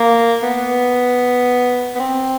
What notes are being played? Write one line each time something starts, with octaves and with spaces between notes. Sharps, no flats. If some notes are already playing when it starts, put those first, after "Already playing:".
Already playing: A#3
B3
B3
C4